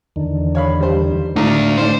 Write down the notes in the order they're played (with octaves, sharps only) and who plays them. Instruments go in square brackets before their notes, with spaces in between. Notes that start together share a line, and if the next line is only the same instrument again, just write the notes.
[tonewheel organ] E2 D3 D#3
[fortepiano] C#5 F5 B5
G3 C5
[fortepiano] G#1 A4 A#5 [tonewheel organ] A2 D3 F5 [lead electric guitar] A3 D4
[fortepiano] D#3 D4 D5 [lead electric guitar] C5